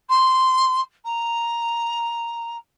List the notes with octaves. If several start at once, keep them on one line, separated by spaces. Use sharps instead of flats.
C6
A#5